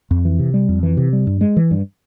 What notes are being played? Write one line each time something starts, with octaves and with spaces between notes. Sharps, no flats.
F2
E3
C3
G3
F2
E3
C3
G3
G2
G#3
E3
G2